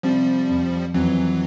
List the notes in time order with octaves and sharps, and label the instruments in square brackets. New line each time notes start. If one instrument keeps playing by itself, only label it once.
[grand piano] C3 [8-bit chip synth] F3 G3
[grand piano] F2
[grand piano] F2 [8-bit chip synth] E3 F#3